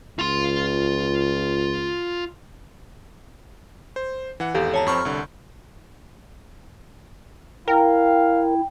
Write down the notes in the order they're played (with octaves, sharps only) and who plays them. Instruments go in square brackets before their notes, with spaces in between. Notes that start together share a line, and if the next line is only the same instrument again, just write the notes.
[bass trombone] C#2 [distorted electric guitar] F4 C6
[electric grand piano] C5
E3 F#5
[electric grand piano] G#1 E2 G6 [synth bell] G4 A4 F5
[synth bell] C#5 A5 A#5
[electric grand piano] F2 C4 [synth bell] B5 C#6 F6
[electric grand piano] C2 D3
[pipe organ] E4 [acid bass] A#4 [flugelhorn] F5 [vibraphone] G5